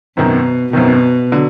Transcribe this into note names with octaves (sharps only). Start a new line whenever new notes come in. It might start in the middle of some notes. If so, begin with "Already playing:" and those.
G#1 F#2 B2 D#3
G#1 F#2 B2 D#3
D3 F#3